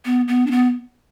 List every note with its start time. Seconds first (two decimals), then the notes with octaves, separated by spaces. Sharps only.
0.05 B3
0.28 B3
0.47 D4
0.51 B3